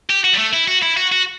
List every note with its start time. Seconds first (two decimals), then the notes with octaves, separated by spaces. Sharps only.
0.10 G4
0.24 F#4
0.33 G3
0.39 A3
0.53 E4
0.68 F#4
0.82 E4
0.97 F#4
1.12 F#4